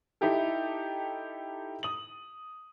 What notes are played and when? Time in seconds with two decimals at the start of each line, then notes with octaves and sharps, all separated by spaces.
0.21 D#4 E4 G4 A4
1.83 D#6 F#7